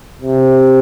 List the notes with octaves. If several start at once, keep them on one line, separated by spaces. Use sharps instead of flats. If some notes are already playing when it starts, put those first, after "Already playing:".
C3